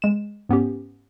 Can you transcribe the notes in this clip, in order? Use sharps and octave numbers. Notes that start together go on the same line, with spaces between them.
G#3 E7
G#2 B3 C#4 G4